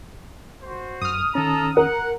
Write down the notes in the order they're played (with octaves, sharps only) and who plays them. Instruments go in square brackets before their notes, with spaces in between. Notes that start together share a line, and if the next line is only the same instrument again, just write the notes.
[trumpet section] F#4 C5
[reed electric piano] F#2 [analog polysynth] D#6 F6
[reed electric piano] D#3 C#4 [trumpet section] A4 A5 A#5
[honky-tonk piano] A#4 [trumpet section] F#5